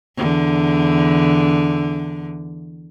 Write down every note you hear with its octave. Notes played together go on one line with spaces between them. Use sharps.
E2 D3